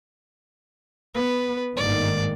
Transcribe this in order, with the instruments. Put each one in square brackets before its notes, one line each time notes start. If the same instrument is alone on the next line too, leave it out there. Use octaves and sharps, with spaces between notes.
[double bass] B3 [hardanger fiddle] B4
[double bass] G1 A#3 [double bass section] G#2 D#3 [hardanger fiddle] D5